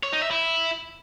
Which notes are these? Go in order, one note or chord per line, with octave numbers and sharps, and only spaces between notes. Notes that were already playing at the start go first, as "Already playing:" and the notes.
C#5
D#4
E5
E4